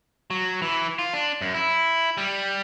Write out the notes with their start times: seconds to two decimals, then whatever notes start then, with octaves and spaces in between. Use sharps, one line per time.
0.30 F#3
0.62 E3
0.99 F4
1.14 D4
1.41 F#2
1.54 E4
2.17 G3